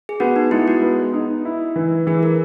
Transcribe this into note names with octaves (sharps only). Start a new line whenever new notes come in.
G#4
B3 F#4
D#4
G#3 E4
F#4
B3
D#4
E4
E3
E3 G#4
A#4